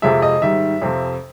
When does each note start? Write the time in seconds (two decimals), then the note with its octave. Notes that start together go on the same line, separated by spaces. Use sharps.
0.02 F2 C3 F3 G#3 E5
0.22 D#5
0.42 G#2 D#3 G3 E5
0.82 F2 C3 F3